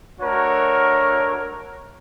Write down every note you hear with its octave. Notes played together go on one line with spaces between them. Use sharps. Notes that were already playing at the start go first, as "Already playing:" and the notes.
A3 D4 F#4 A#4 C#5